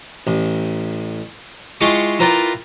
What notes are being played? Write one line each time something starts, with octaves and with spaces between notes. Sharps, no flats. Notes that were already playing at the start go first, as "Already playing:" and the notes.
A1
G#3 E4 F4 G5 C#6 D6
E4 F4 A#4 B4 D5 G5